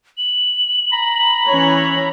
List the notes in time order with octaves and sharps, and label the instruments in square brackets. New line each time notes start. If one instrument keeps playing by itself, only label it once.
[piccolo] F#7
[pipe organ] A#5 B5
[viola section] E3 C#4 C#5